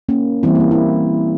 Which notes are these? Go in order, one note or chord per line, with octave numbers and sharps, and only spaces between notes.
A#3 C#4
E3 G3 A#3 C4 E4
A#3
C4
E4